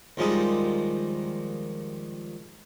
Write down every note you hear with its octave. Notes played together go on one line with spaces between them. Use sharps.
D#2 F3 G3 G#3 D#4